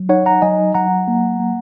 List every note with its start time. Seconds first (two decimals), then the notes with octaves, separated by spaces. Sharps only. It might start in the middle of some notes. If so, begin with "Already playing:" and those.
Already playing: F#3
0.09 D#4 C#5 F#5
0.26 F#5 A#5
0.42 F#3 D#5 G#5
0.74 F#3 F#5 A#5
1.08 A#3
1.40 A#3